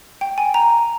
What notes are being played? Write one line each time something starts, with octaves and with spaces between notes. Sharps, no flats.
G5
G#5
A#5